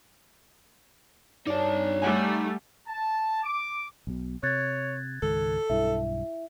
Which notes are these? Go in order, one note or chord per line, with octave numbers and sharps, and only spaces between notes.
G2 D#4 C#5 D5 A5
G3 A3 F#5 G#5
A5
D6
B1 B2
C3 C#5 F#6 G#6 A6
C#2 G#2 D#3 A4
B1 G2 E4 E5